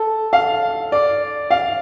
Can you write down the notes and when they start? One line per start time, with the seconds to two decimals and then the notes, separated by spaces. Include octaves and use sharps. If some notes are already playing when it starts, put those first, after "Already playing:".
Already playing: A4
0.33 F5
0.92 D5
1.51 F5